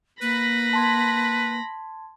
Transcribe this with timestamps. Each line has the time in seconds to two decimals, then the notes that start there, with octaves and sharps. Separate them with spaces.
0.22 A#3 B4 B5 A#6
0.73 A5 C6 G#6